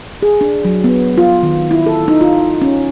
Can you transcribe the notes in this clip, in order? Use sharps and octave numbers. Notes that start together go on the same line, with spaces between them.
G#4
D4
F#3
B3
F4
D#3
E4
A4
D#4
F4
C#4